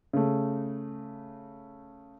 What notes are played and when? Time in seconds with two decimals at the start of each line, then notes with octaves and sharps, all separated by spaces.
0.13 C#3 A3